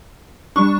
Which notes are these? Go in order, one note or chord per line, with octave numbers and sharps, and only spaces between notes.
G3 D4 C#6